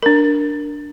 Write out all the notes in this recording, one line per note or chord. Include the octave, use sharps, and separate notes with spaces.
D4 A#4